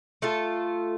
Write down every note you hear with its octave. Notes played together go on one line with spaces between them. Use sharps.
A3 F4 A4